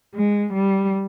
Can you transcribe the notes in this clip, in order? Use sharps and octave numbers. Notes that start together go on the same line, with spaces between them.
G#3
G3